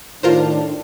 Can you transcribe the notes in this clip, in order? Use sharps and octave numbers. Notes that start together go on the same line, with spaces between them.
A2 D#3 D4 F4 A#4 C5